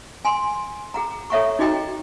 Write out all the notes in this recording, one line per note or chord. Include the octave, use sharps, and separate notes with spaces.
G#5 C6
G#4 F#5 A#5
A4 C#5 E5 F#5 A#5 C#6
D#4 F#4 G#4 D#5 G5 A#5